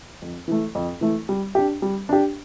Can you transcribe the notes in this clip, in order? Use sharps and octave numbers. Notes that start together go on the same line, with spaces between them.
F2
E3 A3
F2
E3 A3
G3
D4 G4
G3
D4 G4